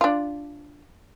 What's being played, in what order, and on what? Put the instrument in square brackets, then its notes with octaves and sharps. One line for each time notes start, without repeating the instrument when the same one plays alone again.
[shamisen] D4 F4